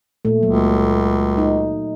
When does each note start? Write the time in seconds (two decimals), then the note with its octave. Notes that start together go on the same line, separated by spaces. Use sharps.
0.25 A#2 A3
0.43 C#2 F#3
1.38 D#4